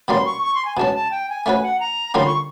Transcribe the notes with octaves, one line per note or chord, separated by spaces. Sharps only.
B2 G3 A#3 C#4 C6
C#6
C#6
C6
G#5
B2 G#3 C#4 A5
A5
G5
G#5
A3 C#4 F#4 B4 G#5
F#5
A#5
D3 G3 A#3 C#4 F4 C6
C#6